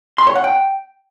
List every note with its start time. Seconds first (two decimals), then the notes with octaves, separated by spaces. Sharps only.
0.18 C6
0.27 C#5
0.35 F#5
0.44 G5